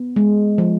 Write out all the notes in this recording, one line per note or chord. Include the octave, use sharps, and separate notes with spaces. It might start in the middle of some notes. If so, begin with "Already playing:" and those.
Already playing: B3
G#3
F3